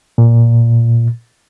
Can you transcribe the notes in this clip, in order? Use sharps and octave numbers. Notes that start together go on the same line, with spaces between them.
A#2